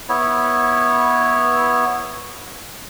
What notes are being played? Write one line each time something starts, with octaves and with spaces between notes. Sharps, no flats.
B3 E4 C#5